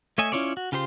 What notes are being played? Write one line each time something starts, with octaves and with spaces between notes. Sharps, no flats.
A3 C#5 D#5 E5 G#5
C#4 E4 F4 C#5 D5
F#4
C#3 F4 G4 C5 C6